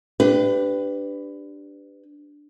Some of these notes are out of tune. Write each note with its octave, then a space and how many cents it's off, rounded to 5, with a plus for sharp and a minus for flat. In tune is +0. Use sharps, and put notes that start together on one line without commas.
D4 +0 G4 +0 B4 +25